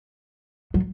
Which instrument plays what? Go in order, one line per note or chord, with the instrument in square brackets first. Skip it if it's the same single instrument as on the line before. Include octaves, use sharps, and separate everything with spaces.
[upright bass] F#3